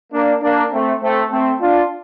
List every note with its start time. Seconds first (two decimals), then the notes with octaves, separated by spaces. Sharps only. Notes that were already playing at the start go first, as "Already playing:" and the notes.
0.13 A#3 D4
0.43 A#3 D4
0.72 A3 C4
1.03 A3 C4
1.32 A3 C4
1.61 D4 F4